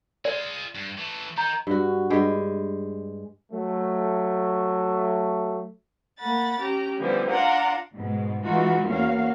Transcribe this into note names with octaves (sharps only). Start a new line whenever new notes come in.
G#3 F4 D5
G2
E3 A3
D#3 D#4 A#5 G6
G2 F#4
G2 G#3 G4
F#3 A3
A#3 F#5 B5 A6
C#4 G4 A#5
D3 E3 F3 G3 B3
D4 F4 F5 F#5 A#5
G#2 B2 G#3
E3 G#3 D#4 F4 F#4
E2 A#3 C#4 F#4 F5